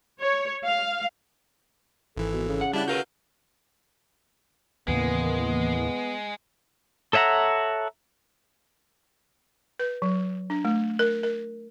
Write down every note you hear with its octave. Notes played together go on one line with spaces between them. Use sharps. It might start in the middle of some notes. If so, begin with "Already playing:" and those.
C#5
F5
G#1 E3 A4
B2
C#3
F#5
G3 D4 E4 F#5 F#6
F#4 A#4 B4 F5 G6
D#2 A2 C#3 E3 G#3 A#3 B3
A4 C#5 E5 F#5 A#5
B4
F#3
D4
A3
A#4
A#4